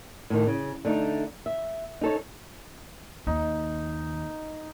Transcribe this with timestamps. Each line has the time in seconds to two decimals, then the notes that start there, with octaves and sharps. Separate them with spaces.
0.30 A2 D#3
0.47 C#3
0.85 D3 A3 D#4
1.46 E5
2.01 D#4 A4 C#5
3.27 D#2 D#4